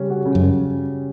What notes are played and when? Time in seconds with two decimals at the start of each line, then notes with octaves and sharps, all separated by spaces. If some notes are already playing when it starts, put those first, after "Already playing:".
Already playing: C#3 G3 C#4
0.10 F#4
0.25 C#3
0.35 F#2
0.41 C#4